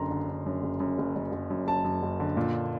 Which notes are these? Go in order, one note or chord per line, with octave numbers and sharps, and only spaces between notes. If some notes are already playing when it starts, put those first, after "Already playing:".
Already playing: F#1 F#2 D3 A#5 C6
D3
D3
F#2
F#1
F#2
F#1
F#1
F#1
F#2
F#1 A5
F#2
F#1
D3
A#2